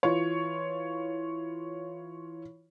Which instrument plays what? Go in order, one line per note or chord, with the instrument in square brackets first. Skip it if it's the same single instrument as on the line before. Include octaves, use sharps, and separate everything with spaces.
[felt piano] E3 F4 C#5